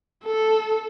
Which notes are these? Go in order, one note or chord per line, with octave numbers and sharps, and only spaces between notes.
A4